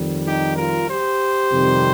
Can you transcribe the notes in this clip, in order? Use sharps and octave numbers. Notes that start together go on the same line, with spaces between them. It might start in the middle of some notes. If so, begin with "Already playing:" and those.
Already playing: F2 D#3 G3
D#4 G4
F4 A#4
G4 C5
F2 C3 D#3 G3